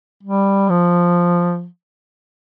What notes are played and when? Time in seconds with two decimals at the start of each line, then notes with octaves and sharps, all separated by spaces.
0.23 G3
0.69 F3